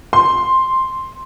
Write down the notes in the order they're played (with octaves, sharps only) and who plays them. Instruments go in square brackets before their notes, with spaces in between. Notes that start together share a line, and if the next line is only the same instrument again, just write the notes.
[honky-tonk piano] C6